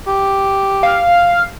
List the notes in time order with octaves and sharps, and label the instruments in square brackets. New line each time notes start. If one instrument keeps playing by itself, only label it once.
[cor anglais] G4
[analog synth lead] F5